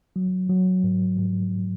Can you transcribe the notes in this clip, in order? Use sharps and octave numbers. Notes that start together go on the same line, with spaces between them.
F#3
F#3
G#2
G#2